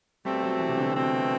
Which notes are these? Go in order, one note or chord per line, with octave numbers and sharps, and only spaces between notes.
B2 G3 A3 C4
F#3
E3
C3
D3
B2 A3 C4